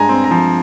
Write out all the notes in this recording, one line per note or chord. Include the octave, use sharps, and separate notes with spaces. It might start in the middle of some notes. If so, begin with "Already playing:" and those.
Already playing: G2 G#3 G#5 A#5
C4
A#5
F3